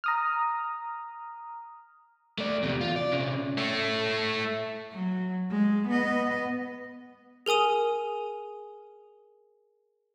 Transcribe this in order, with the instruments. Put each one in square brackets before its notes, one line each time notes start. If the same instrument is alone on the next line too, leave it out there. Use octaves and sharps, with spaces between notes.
[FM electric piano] A#5 D#6 F6
[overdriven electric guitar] A3 D5
E2 C3
F4
D5
C3 C#4
[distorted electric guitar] A3 C#5
[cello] F#3
G#3
B3 D#5
[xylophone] G#4 A#4 G#5 D#6 D#7